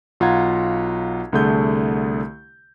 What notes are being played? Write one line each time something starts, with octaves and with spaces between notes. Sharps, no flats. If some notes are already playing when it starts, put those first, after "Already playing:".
B1 F4 F#5 A#5 G#6
C2 D3 A3 G#4 G6